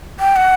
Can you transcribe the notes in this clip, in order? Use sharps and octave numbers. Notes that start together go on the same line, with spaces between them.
G5
F#5